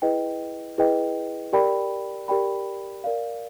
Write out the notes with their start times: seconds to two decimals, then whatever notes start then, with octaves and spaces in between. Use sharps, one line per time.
0.02 E4 G#4 B4 D#5 G5
0.78 E4 G#4 B4 D#5 G5
1.53 G4 A#4 D5 G5 B5
2.28 G4 A#4 D5 G5 B5
3.04 A#4 D5 F5